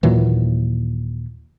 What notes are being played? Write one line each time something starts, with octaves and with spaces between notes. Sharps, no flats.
D#2 A#2 E3 F#3